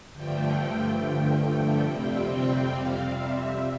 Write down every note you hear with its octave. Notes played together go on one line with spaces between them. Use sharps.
G2 D3 F3 A3 G5
F2 C3 G3 C4 G5
F5
E5